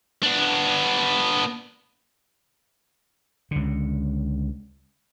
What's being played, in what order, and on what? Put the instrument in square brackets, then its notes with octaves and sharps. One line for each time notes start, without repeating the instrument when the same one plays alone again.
[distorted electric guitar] B3 D4
[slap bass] C#2 D3